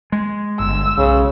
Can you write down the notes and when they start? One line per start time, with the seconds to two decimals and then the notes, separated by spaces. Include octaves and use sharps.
0.12 G#3
0.59 G1 E6
0.98 B1 C#3